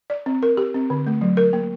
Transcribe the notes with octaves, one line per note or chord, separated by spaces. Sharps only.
D5
C4
A#4
G4
C4
D3
A3
F#3
A#4
A#3